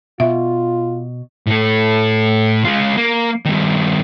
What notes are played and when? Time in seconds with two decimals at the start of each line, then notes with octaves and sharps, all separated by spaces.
0.20 B2 F4 E5
1.47 A2 A4
2.65 G#3 F4
2.97 A#3
3.46 G2 D#3